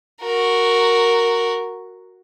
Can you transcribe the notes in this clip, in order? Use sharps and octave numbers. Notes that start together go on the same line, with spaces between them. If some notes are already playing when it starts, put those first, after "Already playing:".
F#4 A#4